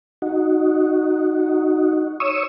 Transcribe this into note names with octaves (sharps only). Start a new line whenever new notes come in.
D#4 F#4
C#5 C#6 D#6 E6